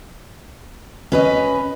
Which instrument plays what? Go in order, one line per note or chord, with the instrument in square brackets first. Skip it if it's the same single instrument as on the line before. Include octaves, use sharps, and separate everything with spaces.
[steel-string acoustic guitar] C#4 B4 D#5